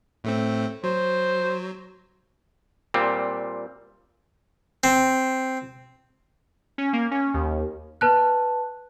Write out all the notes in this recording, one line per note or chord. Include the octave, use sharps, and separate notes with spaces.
A2 A3 C4
F#3 C5
A#2 G3 C4
C4
C#4
A#3
C#4
D#2
B4 A5 F#6